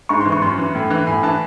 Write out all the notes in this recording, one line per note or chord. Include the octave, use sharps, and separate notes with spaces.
G#2 C#6
C6
E3
C#6
F#2 C6
E3
A2
E3
A2 G#5
E3 A5